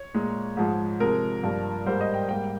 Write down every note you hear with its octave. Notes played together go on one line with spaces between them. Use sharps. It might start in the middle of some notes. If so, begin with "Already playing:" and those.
Already playing: C#5
A#2 G#3
G#2 F3 G#3
C3 F3 G#3 A#4
G2 F3 A#3
G#2 G3 A#3 C5
D#5
G5
G#2 G3 A#3 G5